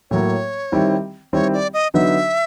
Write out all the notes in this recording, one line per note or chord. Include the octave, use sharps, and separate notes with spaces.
A2 F#3 A#3 C#5
D#3 G3 C4 E4
D#3 G3 C4 E4 C#5
D5
D#5
D3 F#3 B3 D#4 E5